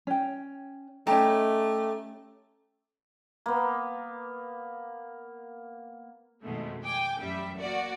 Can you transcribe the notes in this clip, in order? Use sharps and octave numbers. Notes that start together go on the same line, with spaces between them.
C#4 G5
A3 C#4 D#4 G4 A5 A#5
A#3 B3
F2 B2 D#3 G#3 A3
G5 G#5 D6
A1 F#2 G3 E5
A#3 F#4 D5